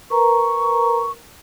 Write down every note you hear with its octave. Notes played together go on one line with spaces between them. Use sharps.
A#4 B4 A#5 C#6